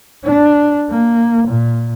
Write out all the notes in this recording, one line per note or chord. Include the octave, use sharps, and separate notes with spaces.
D4
A#3
A#2